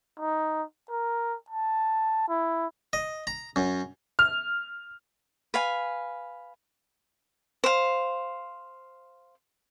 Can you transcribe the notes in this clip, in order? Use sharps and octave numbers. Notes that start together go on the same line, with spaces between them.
D#4
A#4
A5
E4
D#5
A#5
F#2
F6
B4 F5 G#5
C5 F5